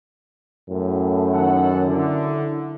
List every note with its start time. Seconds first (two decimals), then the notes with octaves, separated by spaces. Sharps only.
0.70 F#2 A2
1.33 D#3 A4 F#5
1.87 D3 E4